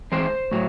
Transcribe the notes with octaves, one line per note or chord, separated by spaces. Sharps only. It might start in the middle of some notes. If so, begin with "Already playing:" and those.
E3 G#3 C4 C5
A2 F#3 A3